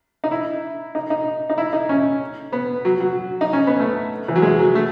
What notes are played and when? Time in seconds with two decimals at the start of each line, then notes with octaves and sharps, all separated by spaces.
0.24 D#4
0.31 E4
0.95 D#4
1.10 D#4
1.50 D#4
1.58 E4
1.73 D#4
1.89 C#4
2.53 B3
2.85 F#3
3.00 F#3
3.41 D#4
3.53 C#4
3.67 B3
3.80 A3
4.28 E3
4.36 F#3
4.42 G#3
4.59 F#3
4.75 A3